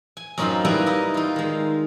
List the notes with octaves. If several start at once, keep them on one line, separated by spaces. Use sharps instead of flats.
G#5
F#2 C4 D#4 F4 B5 C6
G3 A#3 E4 A#4 B4 D#5
D#4 E4 D#5
D#4 F4
D#3 G#3